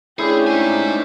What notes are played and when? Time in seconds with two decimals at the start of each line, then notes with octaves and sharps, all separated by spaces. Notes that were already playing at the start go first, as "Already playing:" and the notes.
0.19 A3 C#4 D4 E4 G4 G#4 C5
0.47 D#4 G#5